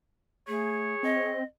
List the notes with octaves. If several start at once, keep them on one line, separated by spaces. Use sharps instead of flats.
A3 G#4 C#5
C4 D#5